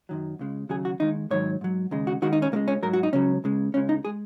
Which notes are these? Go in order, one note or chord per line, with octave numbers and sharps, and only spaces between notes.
F#2 D#3 F#3
C#2 C#3 G#3
D#2 C#3 F#3 G#4
F#4
D#2 D#3 G#3 D#4
G#2 D#3 F#3 C#5
G#2 F#3
D#2 C#3 G#3
F#4
D#2 D#3 G#3 F#4
D#4
C#4
C#2 C#3 G#3 A#3
C#4
G#2 F#3 A#4
F#4
D#4
C#2 C#3 F#3 C#4
C#2 C#3 G#3
C#2 C#3 G#3 C#4
D#4
G#3 G#4